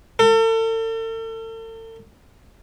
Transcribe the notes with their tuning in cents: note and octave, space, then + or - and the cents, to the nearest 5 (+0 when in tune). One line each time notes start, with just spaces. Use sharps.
A4 +40